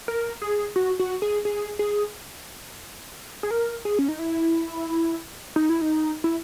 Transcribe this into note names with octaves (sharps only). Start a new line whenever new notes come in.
A#4
G#4
F#4
F#4
G#4
G#4
G#4
G#4
A#4
G#4
C#4
D#4
E4
D#4
E4
D#4
E4